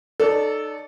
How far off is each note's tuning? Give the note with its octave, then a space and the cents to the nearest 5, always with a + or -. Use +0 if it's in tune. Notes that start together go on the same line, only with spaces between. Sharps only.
D#4 -35 A4 -5 D5 -35